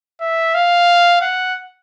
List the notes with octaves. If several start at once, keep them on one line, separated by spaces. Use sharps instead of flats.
E5
F5
F#5